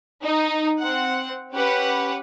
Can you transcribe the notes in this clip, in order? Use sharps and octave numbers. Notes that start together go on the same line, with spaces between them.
D#4
C4 F#5
C#4 G4 B4 F#5